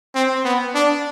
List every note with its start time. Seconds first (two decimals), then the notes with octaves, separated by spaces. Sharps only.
0.15 C4
0.45 B3
0.75 D4